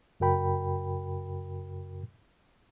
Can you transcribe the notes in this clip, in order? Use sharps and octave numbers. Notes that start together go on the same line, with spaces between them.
F#2 C#3 F#4 A#4 G5 B5